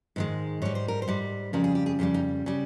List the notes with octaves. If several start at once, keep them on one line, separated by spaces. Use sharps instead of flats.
G#2 D#3 G#3
G#2 G3 C#5
C5
A#4
C5
G#2 G3
F2 C#3 G3 A#4
G#4
G4
G#4
F2 C#3 G3 G4
D#4
C#3 G3